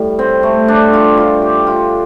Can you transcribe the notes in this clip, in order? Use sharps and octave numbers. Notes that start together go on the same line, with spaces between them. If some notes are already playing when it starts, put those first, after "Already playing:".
Already playing: A2 G3
C4
A3
D4
F4
F4
G4
F4